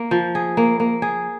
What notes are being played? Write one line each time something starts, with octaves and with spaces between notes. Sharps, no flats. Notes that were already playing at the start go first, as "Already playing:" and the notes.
Already playing: A#3
F3
G#4
A#3
A#3
G#4